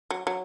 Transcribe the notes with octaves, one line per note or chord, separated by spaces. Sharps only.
F#3
F#3